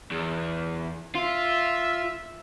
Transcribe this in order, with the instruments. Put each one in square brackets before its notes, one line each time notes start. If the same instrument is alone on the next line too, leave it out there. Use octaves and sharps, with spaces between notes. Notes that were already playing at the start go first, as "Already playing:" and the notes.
[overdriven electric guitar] E2
[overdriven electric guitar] F4 [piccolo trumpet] E5